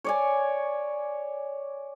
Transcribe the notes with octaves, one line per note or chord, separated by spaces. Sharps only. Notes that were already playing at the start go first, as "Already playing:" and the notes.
C#5 D5 G#5